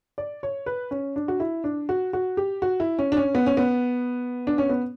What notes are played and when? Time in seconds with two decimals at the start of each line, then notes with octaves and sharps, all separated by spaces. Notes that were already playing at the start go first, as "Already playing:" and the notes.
0.18 D5
0.43 C#5
0.66 B4
0.91 C#4
1.16 D4
1.28 F#4
1.40 E4
1.64 D4
1.89 F#4
2.13 F#4
2.37 G4
2.62 F#4
2.80 E4
2.99 C#4
3.12 D4
3.17 C#4
3.35 B3
3.46 C#4
3.57 B3
4.47 D4
4.58 C#4
4.69 B3